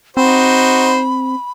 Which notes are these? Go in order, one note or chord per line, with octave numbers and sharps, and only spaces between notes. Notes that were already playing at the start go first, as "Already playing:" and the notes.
C4 D#4 F#4 C5 B5